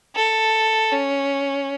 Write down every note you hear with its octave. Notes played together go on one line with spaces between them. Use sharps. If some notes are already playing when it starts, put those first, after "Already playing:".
A4
C#4